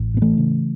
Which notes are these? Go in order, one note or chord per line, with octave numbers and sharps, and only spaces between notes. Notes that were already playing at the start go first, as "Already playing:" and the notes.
Already playing: A1
A2 B3
E3 A3
C#3